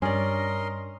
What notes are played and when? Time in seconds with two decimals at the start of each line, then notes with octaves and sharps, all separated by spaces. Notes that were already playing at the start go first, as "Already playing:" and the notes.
0.02 G2 C#4 A#4 D5 D#5 C6